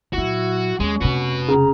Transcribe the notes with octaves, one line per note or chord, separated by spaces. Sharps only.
A#2 F#3 E4 F#4
D#2 G#3 A#3 C#4
F1 C3 F#4 B4
C#3 A#5